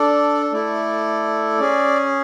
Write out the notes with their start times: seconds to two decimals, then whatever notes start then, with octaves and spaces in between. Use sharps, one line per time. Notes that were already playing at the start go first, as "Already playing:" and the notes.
Already playing: D4 A4 D5
0.53 A3 E4 A4 D5
1.59 C#4 G#4